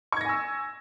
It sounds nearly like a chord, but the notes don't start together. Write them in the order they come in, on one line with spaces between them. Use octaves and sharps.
C#6 G#6 A#6 G#5 E6